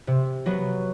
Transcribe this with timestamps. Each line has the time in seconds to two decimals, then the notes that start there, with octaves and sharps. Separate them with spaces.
0.07 C3
0.46 F#3 B3 F#4